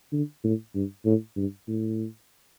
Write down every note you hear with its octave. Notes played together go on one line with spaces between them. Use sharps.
D3
A2
G2
A2
G2
A2